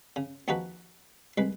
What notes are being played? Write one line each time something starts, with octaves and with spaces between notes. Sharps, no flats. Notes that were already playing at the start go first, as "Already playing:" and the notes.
C#3
D#2 F3 D#4 F#4 G#4 B4
C2 G#3 B4